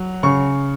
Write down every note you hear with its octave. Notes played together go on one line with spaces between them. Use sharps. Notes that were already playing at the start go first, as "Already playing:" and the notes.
Already playing: F#3
C#3 C#6